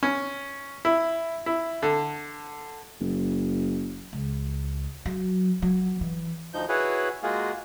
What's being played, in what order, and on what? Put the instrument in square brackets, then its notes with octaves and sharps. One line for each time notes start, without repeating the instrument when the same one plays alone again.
[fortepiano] C#4
E4
E4
D3
[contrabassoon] F#1
[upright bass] C#2
F#3
F#3
E3
[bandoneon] D2 F3 D#4 G6
E4 F#4 G#4 B4 C#5
G#3 A#3 F4 F#4 G#4